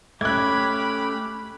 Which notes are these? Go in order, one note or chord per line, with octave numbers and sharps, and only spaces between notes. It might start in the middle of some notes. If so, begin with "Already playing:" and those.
A3 C#4 G4 B5 D6 F#6 G#6